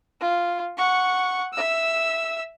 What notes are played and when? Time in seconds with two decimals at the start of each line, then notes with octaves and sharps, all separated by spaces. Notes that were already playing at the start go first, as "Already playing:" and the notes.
0.21 F4
0.77 F#5 C#6
1.53 E5 E6